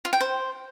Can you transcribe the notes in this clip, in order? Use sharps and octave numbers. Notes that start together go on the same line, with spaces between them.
F4
G5
C5